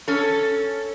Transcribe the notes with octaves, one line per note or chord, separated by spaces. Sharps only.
C#4 A4